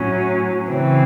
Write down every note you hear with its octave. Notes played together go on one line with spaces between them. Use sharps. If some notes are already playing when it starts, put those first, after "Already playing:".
Already playing: A2 F#3 C#4
C#3 E3 C4